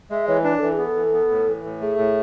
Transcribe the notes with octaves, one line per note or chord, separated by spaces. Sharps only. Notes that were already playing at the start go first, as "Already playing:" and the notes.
G#3 E5
E3 C#5
D4 B4
E3 A4
G#4
B3
A4
E3
B3
A2
E3
A2
A3 G#4
A2